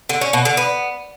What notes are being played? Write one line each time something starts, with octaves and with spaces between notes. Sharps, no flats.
D3
C#4
B2
D3
B3